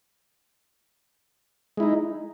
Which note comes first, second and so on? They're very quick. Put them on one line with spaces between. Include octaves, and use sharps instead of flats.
G#3 E4 D#4